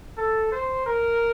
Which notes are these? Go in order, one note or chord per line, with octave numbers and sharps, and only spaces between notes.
A4
C5
A#4